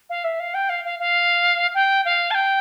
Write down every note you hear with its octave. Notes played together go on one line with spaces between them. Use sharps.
F5
E5
F5
G5
F5
F5
F5
G5
F5
A5
G5